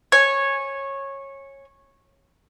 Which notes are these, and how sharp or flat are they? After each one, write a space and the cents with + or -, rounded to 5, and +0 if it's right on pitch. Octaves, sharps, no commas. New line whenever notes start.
C#5 -15 G#5 +0